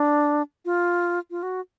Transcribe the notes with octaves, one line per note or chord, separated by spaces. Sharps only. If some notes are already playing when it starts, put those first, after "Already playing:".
Already playing: D4
F4
F4
F#4